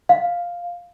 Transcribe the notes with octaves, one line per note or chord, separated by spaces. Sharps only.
F5